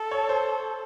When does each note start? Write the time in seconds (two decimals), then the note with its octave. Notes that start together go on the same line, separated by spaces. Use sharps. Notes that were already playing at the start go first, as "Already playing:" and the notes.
Already playing: A4
0.11 C#5
0.29 C5